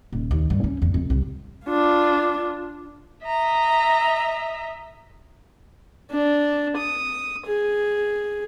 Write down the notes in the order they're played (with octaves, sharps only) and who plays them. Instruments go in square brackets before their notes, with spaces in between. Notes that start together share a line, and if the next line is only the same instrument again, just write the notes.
[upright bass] D#1
D#2
G2
C#4
E2
F2
C2
[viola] D4 F4
[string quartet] D#5 E5 A#5
[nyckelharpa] D4
D#6
G#4